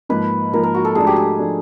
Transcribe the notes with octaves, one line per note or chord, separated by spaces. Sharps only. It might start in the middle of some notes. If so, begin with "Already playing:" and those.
G#2 F3 A#3 B4
G#2 F3 A#3 A#4
A#4
F#4
A4
G#2 F3 A3 D4 G#4
G4
G#4
F3 A3 D4